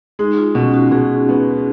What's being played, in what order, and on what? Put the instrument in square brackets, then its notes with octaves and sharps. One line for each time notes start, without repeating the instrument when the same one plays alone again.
[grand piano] G#3 [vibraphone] D#4
[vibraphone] F4
[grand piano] B2 [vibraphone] C#4
[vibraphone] F#4
[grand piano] B2 [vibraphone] G#4
[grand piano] B3